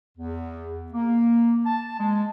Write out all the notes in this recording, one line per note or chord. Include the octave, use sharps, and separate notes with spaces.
E2
A#3
A5
G#3